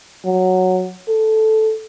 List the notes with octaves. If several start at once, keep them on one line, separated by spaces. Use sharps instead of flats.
F#3
A4